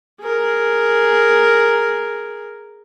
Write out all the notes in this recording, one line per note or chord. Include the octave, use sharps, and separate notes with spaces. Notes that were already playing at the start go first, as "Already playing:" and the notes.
G#4 A#4